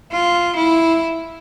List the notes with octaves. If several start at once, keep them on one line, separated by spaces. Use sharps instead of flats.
F4
E4